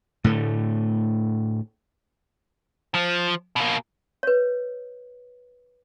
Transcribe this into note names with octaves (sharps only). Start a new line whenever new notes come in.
A2 D3 A3
F3
B2 A#3
B4 C#5